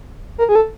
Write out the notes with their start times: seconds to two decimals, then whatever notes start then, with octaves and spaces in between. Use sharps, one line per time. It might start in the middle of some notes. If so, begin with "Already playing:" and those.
0.38 A#4
0.49 G#4
0.55 A4